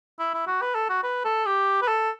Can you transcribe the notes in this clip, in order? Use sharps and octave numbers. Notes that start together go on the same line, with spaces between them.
E4
E4
F#4
B4
A4
F#4
B4
A4
G4
B4
A4